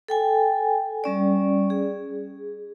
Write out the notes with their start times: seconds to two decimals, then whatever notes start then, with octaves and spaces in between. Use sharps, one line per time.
0.08 A4 G5 G#5
1.04 G3 C#4 D5
1.70 G#4